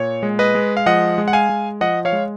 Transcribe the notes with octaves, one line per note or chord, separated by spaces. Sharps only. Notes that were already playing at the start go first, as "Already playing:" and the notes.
Already playing: A#2 C#5
G#3
B4 D#5
G#3
F5
F3 D#5 F#5
G#3
F#5
F5 G#5
G#3
F3 D#5 F#5
C#5 F5
G#3